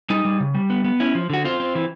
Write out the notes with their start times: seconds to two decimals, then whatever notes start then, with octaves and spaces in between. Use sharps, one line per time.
0.10 G3 D#4
0.25 G3
0.40 C#3
0.55 G3
0.70 B3
0.84 B3
1.00 C#4 E4
1.15 F3
1.30 D3 F#4
1.45 C4 F4
1.60 C4
1.75 E3